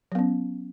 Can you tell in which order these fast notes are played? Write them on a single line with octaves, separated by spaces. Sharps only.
F#3 B3 C#4